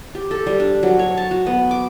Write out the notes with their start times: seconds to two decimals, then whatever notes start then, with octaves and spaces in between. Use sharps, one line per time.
0.15 G4
0.31 A4
0.47 G3
0.60 D4
0.83 F#3
0.99 C#5
1.17 A5
1.31 F#4
1.47 B3
1.71 D6